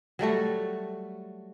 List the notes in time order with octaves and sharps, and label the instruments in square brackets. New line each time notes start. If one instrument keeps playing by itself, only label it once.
[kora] F#3 G3 A3 F#4